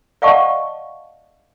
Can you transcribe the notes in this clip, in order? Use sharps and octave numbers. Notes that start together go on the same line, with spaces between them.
D5 D#5 F5 F#5 A5 C#6